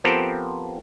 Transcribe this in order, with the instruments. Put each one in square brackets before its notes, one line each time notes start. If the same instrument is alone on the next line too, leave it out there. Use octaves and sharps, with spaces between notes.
[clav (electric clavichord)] F3 B3 C4 G4 A4 A#4